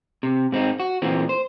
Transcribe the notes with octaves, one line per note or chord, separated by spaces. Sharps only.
C3
G#2 C4 D#4
F#4
A#2 E3 C4
C5